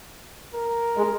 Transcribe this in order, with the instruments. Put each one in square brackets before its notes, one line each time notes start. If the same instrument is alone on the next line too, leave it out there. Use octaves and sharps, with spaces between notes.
[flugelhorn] A#4
[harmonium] G#3